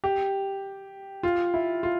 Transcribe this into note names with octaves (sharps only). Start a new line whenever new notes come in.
G4
F4
E4
F4